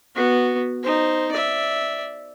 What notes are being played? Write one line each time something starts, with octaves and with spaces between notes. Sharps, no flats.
B3 F#4
D#4 C5
D5 E5